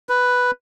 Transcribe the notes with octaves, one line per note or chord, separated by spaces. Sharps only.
B4